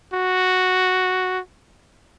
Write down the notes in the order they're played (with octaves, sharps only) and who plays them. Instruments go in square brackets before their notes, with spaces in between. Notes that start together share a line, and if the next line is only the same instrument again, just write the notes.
[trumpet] F#4